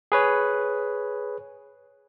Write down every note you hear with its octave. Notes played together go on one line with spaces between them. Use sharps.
G#4 B4 C#5